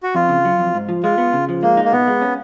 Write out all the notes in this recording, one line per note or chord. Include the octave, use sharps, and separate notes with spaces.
F#4
F2 F4
C#3
F#3
F2
G#2
F3
G#3 F4
B3
C#3
F3
G#3 A#3
D#4
A#3
B2 B3
G#3
C#4